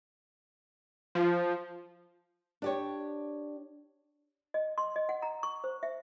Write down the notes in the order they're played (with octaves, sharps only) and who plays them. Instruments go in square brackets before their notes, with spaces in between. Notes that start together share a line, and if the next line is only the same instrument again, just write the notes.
[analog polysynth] F3
[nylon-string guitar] D4 G4 C#5
[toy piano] D#5
C6
D#5
F#5
A#5
C#6
C5
E5